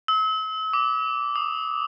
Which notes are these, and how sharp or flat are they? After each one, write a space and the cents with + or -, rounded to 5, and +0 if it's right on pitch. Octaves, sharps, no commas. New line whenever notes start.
E6 -40
D6 -15
D#6 -45